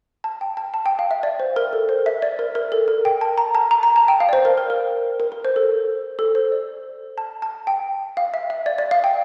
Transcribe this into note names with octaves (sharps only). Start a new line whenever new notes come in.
A5
G5
A5
A5
G5
F5
E5
D5
C5
A#4
A4
C5
E5
D5
A#4
A#4
A4
A#4
G5
A5
A#5
A5
A#5
A#5
A5
G5
F5
D5
C5
A#4
A#4
A#4
A#4
A#4
C5
A4
A4
C5
D5
A5
A5
G5
F5
E5
E5
D5
D5
F5
G5